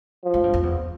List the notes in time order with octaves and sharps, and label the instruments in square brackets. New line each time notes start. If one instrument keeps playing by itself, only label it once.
[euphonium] F3
[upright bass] G#2
G2
F2
E2